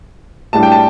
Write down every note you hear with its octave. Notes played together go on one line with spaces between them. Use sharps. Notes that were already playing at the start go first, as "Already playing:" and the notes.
A2 G3 D4 A5
G5
A5